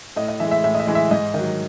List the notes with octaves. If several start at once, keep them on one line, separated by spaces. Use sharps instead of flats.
A2 D#5
D#5
E3 G#3 E5
E5
A2 E5
D#5
E5
E3 G#3
E5
G#2 D#5
D#3 F#3 D#5